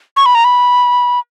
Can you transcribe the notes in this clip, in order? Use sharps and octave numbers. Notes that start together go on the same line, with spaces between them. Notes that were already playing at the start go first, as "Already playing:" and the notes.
C#6
B5
A#5
B5